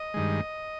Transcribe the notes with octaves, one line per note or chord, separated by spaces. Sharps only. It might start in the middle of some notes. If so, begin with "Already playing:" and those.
Already playing: D#5
G2 D#3 G#3